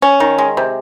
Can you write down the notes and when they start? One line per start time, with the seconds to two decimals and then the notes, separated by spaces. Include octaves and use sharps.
0.02 C#4
0.20 D#3
0.38 G#3
0.57 C3